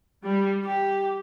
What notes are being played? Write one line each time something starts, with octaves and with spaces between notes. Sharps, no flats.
G3
G4